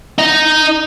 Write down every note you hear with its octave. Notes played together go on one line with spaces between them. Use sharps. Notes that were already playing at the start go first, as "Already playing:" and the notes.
D#4 D#5